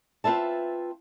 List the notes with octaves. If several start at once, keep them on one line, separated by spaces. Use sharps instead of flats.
C4 F4 B4 E5 A5